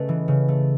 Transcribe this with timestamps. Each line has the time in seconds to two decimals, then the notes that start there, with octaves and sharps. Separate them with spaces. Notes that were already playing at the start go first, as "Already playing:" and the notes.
Already playing: C#3 A3 C#4 A4 B4 D#5
0.09 E3
0.28 C#3
0.48 A3